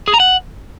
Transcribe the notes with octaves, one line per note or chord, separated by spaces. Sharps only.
G#4
A#5
F#5